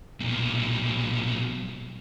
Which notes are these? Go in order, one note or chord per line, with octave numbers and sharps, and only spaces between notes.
B1 A#2